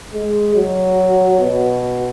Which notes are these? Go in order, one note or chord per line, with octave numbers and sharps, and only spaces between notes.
G#3
F#3
B2